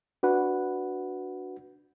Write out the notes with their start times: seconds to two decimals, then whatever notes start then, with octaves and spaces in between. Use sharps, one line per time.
0.23 D4 F#4 B4 F#5